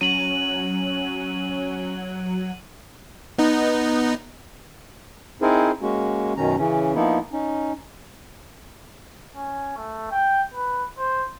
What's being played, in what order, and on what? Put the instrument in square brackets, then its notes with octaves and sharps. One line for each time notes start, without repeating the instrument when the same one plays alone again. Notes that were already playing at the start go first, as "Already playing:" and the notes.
[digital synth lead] F#3 [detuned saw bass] C#4 [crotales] D#7 F#7
[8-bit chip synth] B3 D#4
[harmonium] C4 D#4 E4 G#4 A#4 C5
G#3 A#3 C#4 F#4
F#2 B2 D#3 C#4 A#5
C#3 E3 C#4
F3 A#3 B3 D#4 E4
C#4 D#4
[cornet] C#4
A3
G5
B4
C5